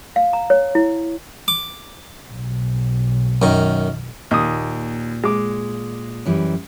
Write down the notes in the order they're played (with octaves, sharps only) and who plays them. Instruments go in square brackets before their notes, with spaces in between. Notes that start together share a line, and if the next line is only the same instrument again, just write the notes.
[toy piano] F5
A#5
C#5
E4
[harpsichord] D6
[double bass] B1
[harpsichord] F#2 D#3
[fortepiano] D#2 D#6 [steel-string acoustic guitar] A#2
[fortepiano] G#3 D6
[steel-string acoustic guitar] F#2 E3 G3